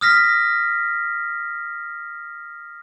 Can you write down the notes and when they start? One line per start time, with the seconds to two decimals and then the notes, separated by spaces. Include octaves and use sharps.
0.01 D#6 F6 A#6 B6